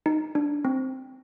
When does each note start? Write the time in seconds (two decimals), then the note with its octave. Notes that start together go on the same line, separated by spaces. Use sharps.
0.06 D#4
0.35 D4
0.65 C4